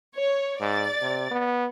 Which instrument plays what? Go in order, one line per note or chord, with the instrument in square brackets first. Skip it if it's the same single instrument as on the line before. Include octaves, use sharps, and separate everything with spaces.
[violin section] C#5
[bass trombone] G#2 [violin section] D5 A6
[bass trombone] C3
B3